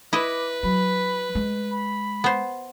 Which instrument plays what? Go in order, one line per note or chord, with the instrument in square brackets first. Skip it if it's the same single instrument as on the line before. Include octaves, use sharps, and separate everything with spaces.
[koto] E4 D#5 [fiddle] B4 [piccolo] D6
[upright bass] F#3 [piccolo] B5
[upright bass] G#3
[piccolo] B5
[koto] B3 C5